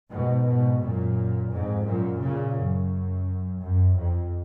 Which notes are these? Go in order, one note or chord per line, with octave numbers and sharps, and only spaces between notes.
G#2 B2
G#2 B2
F#2 A#2
F2 G#2
F#2 A#2
A#2 C#3
F#2
F#2
F2